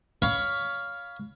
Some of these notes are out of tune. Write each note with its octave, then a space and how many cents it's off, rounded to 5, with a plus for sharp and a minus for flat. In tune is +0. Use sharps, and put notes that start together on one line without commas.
C#5 +20 F5 +0 B5 +0